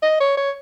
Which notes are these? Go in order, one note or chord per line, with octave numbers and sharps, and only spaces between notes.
D#5
C#5
C#5